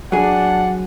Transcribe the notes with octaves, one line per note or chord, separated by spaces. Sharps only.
F#3 D4 G#4 F#5